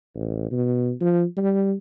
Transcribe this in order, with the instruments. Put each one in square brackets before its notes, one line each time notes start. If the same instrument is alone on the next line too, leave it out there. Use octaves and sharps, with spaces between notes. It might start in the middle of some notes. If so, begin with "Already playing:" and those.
[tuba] A1
B2
F3
G3